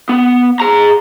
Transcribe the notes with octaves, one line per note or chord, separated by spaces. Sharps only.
B3
G#4 A#5